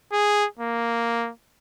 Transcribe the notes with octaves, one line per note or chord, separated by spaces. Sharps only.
G#4
A#3